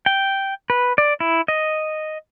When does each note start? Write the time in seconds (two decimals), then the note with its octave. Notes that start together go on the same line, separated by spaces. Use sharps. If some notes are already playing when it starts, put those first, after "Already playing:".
0.06 G5
0.70 B4
0.98 D5
1.20 E4
1.48 D#5